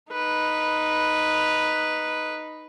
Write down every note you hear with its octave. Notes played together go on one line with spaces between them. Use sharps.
D#4 B4